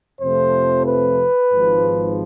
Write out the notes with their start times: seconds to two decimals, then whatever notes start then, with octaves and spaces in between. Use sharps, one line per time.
0.21 F2 C3 F3 A3 C4 C5
0.86 B4
1.51 G#1 G#2 F3